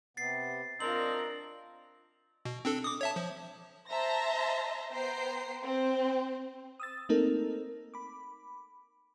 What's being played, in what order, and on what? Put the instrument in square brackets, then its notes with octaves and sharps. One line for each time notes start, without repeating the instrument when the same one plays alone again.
[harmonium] C3 B3 [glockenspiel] A6 C7
[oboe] C4 [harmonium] D4 D#5 A#5 [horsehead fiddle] F4 A#4 [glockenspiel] F#7
[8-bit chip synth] B2
C4 D4 A4
D6 D#6
C#5 E5 A5
F3
[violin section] C5 E5 A5 A#5 C6 A#6
B3 C5 G5 A#5 C7
C4 C5
[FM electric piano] D#6 E6 A6
A3 A#3 C4 D#4 A4 A#4
B5 D6